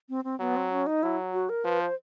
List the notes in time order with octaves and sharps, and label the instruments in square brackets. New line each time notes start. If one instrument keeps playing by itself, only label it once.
[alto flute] C4
C4
[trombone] F#3 [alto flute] B3
[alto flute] C4
C#4
D#4
[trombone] F#3 [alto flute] E4
[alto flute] F#4
A#4
[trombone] F3 [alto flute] B4
[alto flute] C5